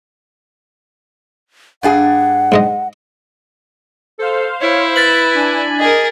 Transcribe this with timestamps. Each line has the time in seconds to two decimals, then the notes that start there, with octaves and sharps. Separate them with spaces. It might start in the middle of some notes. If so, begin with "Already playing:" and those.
1.83 G2 D4 G#4 F#5
2.52 G#2 G#3 D#5
4.19 A4 C5 F5
4.61 E4 C#5
4.96 B4 A6 B6 F#7
5.32 D4 G#5
5.79 G#4 A#4 D#5